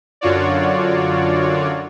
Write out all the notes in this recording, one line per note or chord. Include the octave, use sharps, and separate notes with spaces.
F#2 D3 F4 F#4 C#5 D5